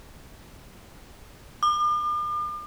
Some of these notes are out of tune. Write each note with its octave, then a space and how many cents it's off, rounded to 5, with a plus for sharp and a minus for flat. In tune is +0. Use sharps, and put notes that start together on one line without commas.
D6 +45